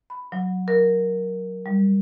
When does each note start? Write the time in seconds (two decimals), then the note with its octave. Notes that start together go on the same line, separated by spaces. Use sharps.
0.10 B5
0.32 F#3
0.68 A#4
1.66 G3